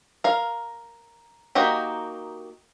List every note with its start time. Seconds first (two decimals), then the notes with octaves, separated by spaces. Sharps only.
0.24 A#4 F5
1.55 A#3 D#4 F#4 G4